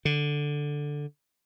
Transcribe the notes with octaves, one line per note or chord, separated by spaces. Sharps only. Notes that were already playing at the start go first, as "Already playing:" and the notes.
D3